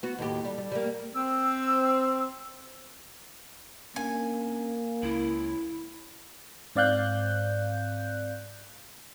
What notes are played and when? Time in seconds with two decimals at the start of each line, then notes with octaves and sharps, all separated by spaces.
0.03 B3 F#4
0.19 D#2 A2 G4
0.45 G3
0.58 G3
0.72 G3 A#3
1.15 C4 E6
3.96 A#3 C#4 D4 G#5
5.03 C#2 E4
6.75 G#2 C4 D5 F5 F#6 G6